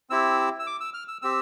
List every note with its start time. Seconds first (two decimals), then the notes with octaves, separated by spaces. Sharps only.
0.10 C4 E4 G4 E6
0.59 E6
0.67 D6
0.80 E6
0.94 F6
1.08 E6
1.22 C4 G4 E6